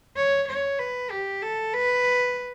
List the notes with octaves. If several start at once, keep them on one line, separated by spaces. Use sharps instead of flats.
C#5
C#5
B4
G4
A4
B4